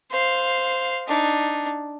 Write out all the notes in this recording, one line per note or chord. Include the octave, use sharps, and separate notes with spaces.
C5 F5
D4 D#4